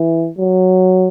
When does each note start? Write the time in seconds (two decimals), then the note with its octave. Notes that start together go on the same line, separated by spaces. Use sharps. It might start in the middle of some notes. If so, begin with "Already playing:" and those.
Already playing: E3
0.38 F#3